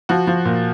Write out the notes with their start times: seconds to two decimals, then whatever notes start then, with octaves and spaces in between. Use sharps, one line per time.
0.09 F3 F#4
0.27 F3
0.45 A#2